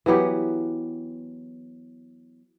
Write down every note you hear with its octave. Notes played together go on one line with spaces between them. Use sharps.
E3 F#3 B3 G4